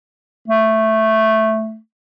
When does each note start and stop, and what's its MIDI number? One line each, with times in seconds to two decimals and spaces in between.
0.48 1.78 57